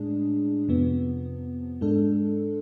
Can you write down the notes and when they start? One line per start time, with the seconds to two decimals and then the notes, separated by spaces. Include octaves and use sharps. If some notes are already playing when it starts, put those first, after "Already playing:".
Already playing: A2 G#3 D4 G#4
0.68 F2 C3 F3 B3
1.81 G#2 G#3 D4 A4